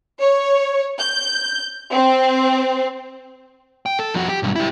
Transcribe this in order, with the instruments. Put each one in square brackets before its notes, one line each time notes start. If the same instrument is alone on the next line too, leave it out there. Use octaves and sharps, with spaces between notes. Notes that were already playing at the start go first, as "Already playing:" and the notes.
[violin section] C#5
G6
C4
[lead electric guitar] G5
A4
F2 F#4
G4
B1 G2
E4 G4